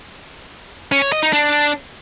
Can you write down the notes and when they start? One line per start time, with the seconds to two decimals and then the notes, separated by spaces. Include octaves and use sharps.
0.92 C#4
1.02 C#5
1.12 D#5
1.23 D#4
1.33 D4